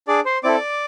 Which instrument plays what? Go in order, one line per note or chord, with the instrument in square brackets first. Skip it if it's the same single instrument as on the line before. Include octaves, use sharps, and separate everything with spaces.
[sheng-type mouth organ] D4 G#4 D5 D6
C5 C6
C4 E4 A4 D5 D6